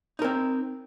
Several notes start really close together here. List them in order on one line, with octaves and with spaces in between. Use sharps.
D#4 A#4 C4